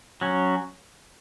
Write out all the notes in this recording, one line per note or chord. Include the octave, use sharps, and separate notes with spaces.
F#3 C#4